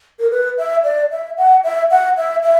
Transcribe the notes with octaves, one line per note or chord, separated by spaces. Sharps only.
A#4
B4
E5
D5
E5
F#5
E5
F#5
E5
E5